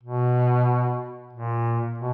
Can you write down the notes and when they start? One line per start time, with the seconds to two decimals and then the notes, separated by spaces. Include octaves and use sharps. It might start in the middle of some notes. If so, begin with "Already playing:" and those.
0.03 B2
1.33 A#2
1.98 B2